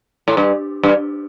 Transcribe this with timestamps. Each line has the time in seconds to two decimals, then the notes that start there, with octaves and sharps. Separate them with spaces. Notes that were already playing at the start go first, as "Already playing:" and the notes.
0.28 A2
0.37 G2
0.83 G2